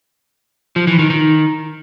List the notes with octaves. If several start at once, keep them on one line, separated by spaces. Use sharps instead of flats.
F3
E3
D#3
D#3